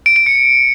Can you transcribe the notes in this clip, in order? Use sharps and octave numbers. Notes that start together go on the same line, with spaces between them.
D7
D7
C#7